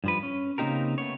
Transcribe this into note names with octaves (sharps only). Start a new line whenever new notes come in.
G2 F3 B4
C#4
C#3 A#3 C4 D#4 G4 A#4
A3 B3 C#5